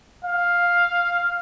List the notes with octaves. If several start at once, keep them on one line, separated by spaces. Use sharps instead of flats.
F5